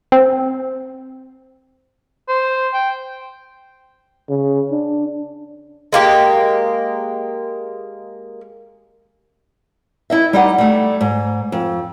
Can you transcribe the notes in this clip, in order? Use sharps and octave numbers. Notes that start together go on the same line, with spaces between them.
C4
C5
G5
C#3
D4
G#3 A#3 G4
E4 D#5 E5
G3 D#4 G4 D#5 F#5
G3 A3
G#2
F2